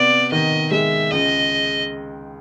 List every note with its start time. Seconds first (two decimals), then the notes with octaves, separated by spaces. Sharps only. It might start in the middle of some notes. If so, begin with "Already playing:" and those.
Already playing: C3 B3 D5
0.32 D#3 D#5
0.71 G#3 E5
1.11 C#2 D#5